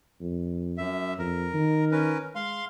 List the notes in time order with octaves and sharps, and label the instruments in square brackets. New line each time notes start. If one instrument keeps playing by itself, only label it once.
[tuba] F2
[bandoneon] F#2 E5
[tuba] F2 [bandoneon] A#4
[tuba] D#3
[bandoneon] C#4 A#4 B4
[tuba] G#3 [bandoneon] F5 C6